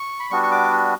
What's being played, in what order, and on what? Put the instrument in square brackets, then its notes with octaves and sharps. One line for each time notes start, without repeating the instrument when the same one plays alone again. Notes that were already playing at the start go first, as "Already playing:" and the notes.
Already playing: [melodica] C#6
B5
G3 B3 D4 F#4 C#6
C#6
D6